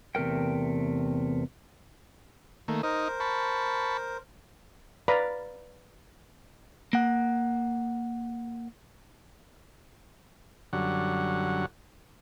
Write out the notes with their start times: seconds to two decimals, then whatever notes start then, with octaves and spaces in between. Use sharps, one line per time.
0.15 E2 C3 A3 A#4 G5
2.68 D#3 A3 A#3
2.83 D#4 A#4 C5 D#5
3.20 A5 B5 C#6
5.08 B4 D5 F5 A#5 B5
6.93 A#3 F#5
10.73 F#2 D3 F#3 G3 F#5